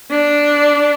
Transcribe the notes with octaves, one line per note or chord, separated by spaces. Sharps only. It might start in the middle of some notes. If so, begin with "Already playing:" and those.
D4